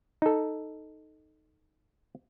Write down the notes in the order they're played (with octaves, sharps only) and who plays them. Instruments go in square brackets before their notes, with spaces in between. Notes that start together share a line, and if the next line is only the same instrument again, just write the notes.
[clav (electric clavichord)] D#4 A4